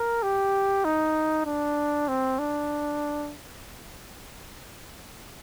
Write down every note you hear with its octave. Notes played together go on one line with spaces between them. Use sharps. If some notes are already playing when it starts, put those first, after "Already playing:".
Already playing: A#4
G4
D#4
D4
C4
D4